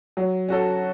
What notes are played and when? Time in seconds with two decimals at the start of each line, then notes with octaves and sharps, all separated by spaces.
0.17 F#3
0.49 C#4 F#4 A4